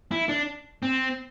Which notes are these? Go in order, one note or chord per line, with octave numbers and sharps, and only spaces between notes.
E4
D4
C4